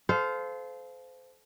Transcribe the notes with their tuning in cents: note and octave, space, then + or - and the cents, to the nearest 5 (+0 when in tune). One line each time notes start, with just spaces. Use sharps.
A4 -30 C5 -20 F5 +5